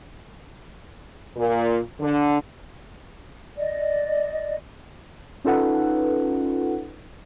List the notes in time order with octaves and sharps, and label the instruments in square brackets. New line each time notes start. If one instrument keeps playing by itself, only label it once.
[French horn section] A#2
D3
[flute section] D5 D#5
[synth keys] C#4 D#4 F4 A4 B4 F#5